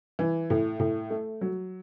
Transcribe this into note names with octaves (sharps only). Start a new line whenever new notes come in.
E3
A2
A2
A3
F#3